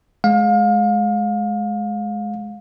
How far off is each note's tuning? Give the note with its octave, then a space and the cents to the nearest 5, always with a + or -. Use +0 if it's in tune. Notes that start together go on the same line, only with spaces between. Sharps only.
G#3 +20 F5 +30